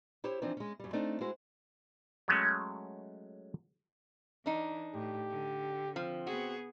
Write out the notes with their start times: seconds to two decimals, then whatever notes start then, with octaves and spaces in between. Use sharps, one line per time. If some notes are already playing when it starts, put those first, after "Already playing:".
0.24 E4 G4 C5 C#5
0.42 E3 F3 C4 D4 D#4
0.57 G#3 C#4
0.80 F#2 G3
0.93 A3 C4 D4 D#4
1.21 G#3 E4 F#4 C5
2.28 F#3 G#3 A3 C#4
4.46 E3 D4 D#4
4.94 A2 G4
5.31 D3
5.96 F3 C4
6.27 B3 F#4 G#4